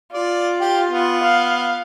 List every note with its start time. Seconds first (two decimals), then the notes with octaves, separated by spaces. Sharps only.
0.14 F4 D5
0.60 G4
0.89 B3
1.23 F5